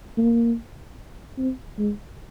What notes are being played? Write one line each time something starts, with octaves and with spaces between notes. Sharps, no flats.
A#3
C4
G#3